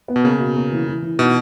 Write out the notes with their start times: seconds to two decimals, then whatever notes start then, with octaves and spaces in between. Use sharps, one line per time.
0.08 B3
0.16 B2
0.24 C#3 A#3
0.40 B2
0.56 A#3
0.71 E3
0.87 E3
1.02 E3
1.19 B2 D#4